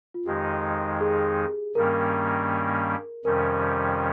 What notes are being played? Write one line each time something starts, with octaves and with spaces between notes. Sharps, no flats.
F4
F2 D#3 G#3 D#4 G4
G#4
G2 D#3 G3 A#3 C#4 A#4
F2 C3 D#3 G3 C#4 A#4